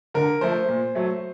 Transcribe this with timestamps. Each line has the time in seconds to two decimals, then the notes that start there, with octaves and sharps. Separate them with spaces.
0.14 D3 A#4
0.41 F3 A3 C5
0.69 A#2
0.95 F#3 A3